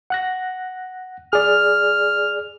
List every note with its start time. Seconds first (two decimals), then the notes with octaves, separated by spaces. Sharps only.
0.10 F#5 F#6 A#6
1.33 G#4 D5 F6